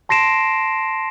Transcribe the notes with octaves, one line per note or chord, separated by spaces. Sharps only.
A5 C6 A#6 C7 D7 E7